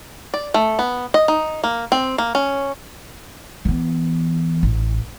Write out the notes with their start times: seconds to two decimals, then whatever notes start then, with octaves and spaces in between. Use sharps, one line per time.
0.34 D5
0.54 A3
0.79 B3
1.14 D#5
1.28 D#4
1.64 A#3
1.92 C4
2.18 A#3
2.35 C#4
3.65 E3 B3
4.63 A1